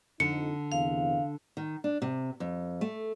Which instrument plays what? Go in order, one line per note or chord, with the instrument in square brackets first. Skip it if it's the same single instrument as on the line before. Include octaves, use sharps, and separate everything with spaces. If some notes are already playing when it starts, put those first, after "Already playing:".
[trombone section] F2 D#4 [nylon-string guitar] D3 [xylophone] C#7
[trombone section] E2 C3 [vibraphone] F5
[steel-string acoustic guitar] D#3
D4
C3
F2
A3